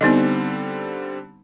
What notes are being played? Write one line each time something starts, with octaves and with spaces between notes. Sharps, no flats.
D3 G3 B3 C4 D#4 D#5